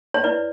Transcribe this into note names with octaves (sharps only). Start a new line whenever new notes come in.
C#5
E4 B4 D5